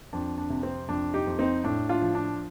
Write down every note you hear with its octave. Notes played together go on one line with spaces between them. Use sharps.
F2 D4
D4
C3
C4
F2 D4
D#4 G4
F2
C4 D#4
A2 D4
D4 F4
F3
D4